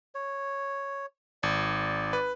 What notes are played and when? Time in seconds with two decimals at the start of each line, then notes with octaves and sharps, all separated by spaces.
0.15 C#5
1.43 G#1 D5
2.13 B4